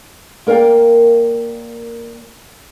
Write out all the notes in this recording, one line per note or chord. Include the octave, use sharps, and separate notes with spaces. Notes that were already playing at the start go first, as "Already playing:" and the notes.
A#3 A#4 D5 F5 G5